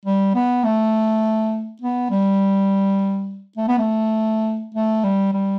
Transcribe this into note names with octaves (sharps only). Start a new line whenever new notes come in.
G3
B3
A3
B3
G3
A3
B3
A3
A3
G3
G3